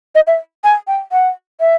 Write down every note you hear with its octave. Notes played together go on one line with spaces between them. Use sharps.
D#5
E5
G#5
G5
F#5
E5